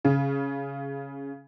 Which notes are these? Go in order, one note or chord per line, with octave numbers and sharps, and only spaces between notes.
C#3